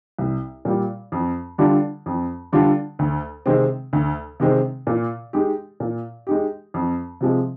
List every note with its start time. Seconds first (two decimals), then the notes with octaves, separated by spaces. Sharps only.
0.19 C2
0.65 A#2 G3
1.12 F2
1.58 D3 G3 D4 F4
2.06 F2
2.52 D3 G3 D4 F4
2.99 D2
3.46 C3 D#3 G#3 C4
3.93 D2
4.40 C3 D#3 G#3 C4
4.87 A#2
5.33 G#3 D#4 G4
5.80 A#2
6.27 G#3 D#4 G4
6.74 F2
7.21 C3 F3 G#3